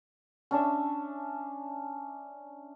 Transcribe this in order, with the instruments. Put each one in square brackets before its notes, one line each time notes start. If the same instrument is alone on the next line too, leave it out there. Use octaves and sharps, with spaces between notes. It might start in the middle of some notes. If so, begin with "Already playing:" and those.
[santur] C#4 D4 E5